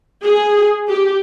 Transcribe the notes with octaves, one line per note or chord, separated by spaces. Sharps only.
G#4
G4